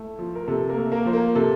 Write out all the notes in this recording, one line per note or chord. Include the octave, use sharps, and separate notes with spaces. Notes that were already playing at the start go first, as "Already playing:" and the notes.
Already playing: A3 E4
F3
A#4
C3 A4
A#3 A#4
A3
A#3 A#4
F3 C5
A#3 A#4
C3 A4